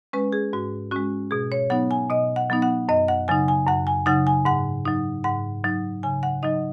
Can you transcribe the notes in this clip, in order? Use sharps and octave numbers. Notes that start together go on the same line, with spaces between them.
G#3 C#4 B4
G#4
G#2 F#4
G#3 C#4 F#4
B2 G#4
C#5
F#3 B3 D#4 F#5
G#5
B2 D#5
F#5
F#3 B3 D#4
F#5
F#2 D#5
F#5
C#3 F#3 D#4 G#5
G#5
F#2 F#5
G#5
C#3 F#3 D#4 F#5
G#5
G#2 F#5
F#3 D#4
G#2 F#5
F#3 D#4
C#3 G#5
F#5
F#3 D#4 D#5